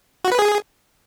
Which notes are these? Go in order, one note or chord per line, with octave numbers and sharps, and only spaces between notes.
F#4
B4
G#4